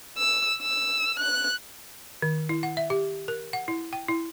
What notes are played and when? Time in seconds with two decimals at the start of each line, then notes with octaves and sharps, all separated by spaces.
0.18 E6
0.62 E6
1.19 F#6
2.22 D#3
2.49 E4
2.63 F#5
2.77 E5
2.90 G4
3.28 A#4
3.53 F#5
3.68 E4
3.93 G5
4.08 E4